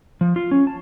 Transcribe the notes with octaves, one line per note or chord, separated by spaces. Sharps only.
F3
F4
C#4
A5